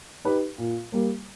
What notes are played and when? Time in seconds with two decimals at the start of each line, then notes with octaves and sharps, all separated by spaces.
0.25 D#4 G4 B4
0.58 A#2
0.92 G3 A#3